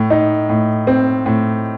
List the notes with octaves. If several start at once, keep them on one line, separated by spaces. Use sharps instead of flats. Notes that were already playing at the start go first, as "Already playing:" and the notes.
Already playing: A2
D#4
A2
C4
A2